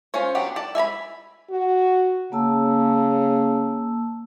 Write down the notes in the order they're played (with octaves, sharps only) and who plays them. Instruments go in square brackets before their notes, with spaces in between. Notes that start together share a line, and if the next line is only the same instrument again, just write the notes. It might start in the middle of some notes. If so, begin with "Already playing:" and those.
[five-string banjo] C#4 F4 C5 C#5
F#3 B3 D4 G4
D5 A5
E5 G#5 A#5 B5
[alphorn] F#4
[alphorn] C#3 [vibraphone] A#3 A5 E6